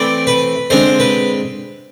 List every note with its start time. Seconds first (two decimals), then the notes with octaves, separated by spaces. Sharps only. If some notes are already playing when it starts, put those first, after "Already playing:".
Already playing: E3 A3 C4 D5
0.27 B4
0.70 D3 G#3 C4 C5
1.00 B4